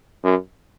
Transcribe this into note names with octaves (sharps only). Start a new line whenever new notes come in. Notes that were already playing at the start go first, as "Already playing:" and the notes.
F#2